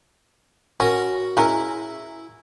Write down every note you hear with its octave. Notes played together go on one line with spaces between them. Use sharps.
C#4 F#4 A#4
G#3 C#4 E4 A#4